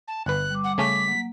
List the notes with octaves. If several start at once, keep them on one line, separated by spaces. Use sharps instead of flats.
A5
G1 B4 F#6
G3 D6
F#5
C#3 A3 C#4 B6
F#3 A#3